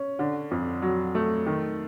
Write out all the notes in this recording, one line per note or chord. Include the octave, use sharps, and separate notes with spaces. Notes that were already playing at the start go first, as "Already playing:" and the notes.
Already playing: C#4
D3
F2
F#3
A3
D#3